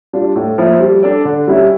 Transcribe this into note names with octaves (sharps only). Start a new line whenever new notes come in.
G3 D4 F4
A2
F3 A#3 E4
G3
D4 A4 D5
D3
G3 C#4 E4